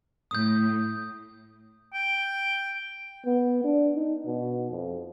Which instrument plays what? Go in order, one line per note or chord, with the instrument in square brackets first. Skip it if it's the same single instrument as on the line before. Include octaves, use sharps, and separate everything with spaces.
[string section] A2 [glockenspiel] D#6 G6
[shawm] G5
[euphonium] B3
D4
D#4
B2
F2